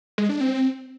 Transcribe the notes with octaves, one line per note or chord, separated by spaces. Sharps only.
G#3
D4
C4